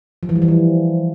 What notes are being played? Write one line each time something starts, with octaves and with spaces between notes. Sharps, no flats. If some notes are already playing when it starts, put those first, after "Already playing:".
F3
E3
G3
E3
F3